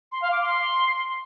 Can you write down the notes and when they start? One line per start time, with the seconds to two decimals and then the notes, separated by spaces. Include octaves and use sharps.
0.12 C6
0.22 F5
0.32 D6
0.41 C6